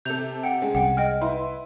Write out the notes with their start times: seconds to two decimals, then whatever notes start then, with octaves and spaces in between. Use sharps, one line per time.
0.05 C3 A4 G6 F7
0.43 F#5 G5
0.62 G#3 C#4
0.75 C2 F#5 G5
0.97 D#5 G5 F6
1.21 E4 B4 C6